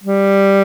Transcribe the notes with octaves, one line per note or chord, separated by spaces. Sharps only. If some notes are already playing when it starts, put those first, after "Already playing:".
G3